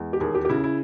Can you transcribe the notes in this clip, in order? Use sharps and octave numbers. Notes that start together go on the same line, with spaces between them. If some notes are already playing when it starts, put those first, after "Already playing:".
Already playing: E2 G#3
G4
D#2 G#4
G4
G4
C#3 E4
E4